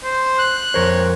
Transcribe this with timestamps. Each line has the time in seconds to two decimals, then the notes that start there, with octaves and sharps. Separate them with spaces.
0.03 C5
0.38 F#6
0.74 F2 A#4 C5 C#5